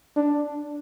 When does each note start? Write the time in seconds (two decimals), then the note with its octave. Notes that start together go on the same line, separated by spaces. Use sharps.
0.16 D4